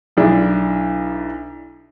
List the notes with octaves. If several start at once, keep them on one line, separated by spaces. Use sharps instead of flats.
B1 D4 E4